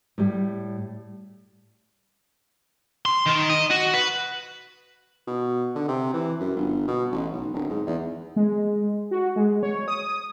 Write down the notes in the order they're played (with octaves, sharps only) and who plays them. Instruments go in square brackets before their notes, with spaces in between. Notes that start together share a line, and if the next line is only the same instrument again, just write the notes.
[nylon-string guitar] A2 G3
[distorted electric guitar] C6
D#3
D#5
F#4
B4
[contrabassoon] B2
D3
C3
E3
F#2
G1
B2
A1
B1
D1
G#2
E2
[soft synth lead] G#3
F#4
G#3
C#5
D#6